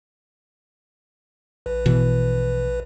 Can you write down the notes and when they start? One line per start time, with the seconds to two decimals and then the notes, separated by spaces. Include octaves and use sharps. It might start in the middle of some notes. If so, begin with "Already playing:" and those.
1.66 A#1 B4
1.86 B2 E3